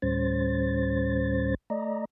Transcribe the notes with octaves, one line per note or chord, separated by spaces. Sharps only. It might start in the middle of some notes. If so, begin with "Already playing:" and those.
D2 A2 G3 C#4 C5 A6
A3 D5 D#5 A#5